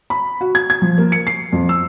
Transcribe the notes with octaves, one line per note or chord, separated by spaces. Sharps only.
B5
F#4
G#6
G#6
F3
A#3
C#7
C7
F2
E6